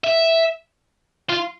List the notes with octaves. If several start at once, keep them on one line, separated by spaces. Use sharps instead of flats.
E5
F4